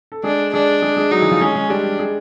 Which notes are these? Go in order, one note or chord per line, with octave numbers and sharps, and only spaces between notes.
A4
G#3 D4 G#4
G#3 D4 G#4
G#3 G#4
G#3 G#4
F#3 D#4 F#4
E3 E4
F3 F4
G#3 C#4 G#4
G#3 G#4
G3 D4 G4
G#3 G#4